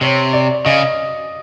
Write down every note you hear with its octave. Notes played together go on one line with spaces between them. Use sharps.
C3 C#5
D5
C#3 D#5